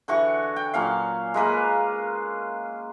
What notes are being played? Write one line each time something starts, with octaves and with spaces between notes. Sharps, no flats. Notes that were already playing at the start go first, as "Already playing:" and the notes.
D3 E3 F#4 C#6
G5
A#2 F#3 C#4 F5
G#3 A#3 B4 F5